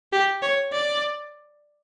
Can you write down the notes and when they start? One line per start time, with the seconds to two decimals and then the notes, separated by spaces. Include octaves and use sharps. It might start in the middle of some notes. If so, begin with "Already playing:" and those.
0.12 G4
0.42 C#5
0.73 D5